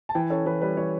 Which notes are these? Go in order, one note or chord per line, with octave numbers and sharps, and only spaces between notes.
A5
E3 G5
C#4 A4
E3 B4
G3 B4
E3 C#5